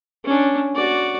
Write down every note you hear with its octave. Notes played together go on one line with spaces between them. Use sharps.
C#4 D4
F#4 D5